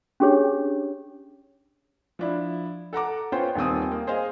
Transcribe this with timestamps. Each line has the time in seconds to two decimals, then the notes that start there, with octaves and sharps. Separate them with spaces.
0.20 C#4 D4 G4 G#4 C#5
2.19 F3 D4 E4
2.93 A4 F#5 A#5 D6
3.32 B3 C#4 F4 C5 G5
3.55 D#1 D#3 C4 D#6
3.91 A#3
4.07 G#4 C5 D#5 F5